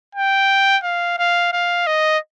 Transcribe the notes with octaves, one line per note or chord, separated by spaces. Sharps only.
G5
F5
F5
F5
D#5